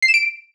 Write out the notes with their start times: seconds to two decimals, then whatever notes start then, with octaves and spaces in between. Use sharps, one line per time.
0.02 C7
0.08 E7
0.14 D7